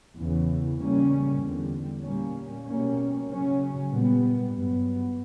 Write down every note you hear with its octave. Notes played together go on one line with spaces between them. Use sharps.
E2 C#3 E3
C#3 G3 A#3 C#4
E2 D3 G3
A#2 G3 A#3 C#4
B2 G3 A#3 C#4
C#3 F#3 C#4
A#2 G3 B3
G2 F#3 B3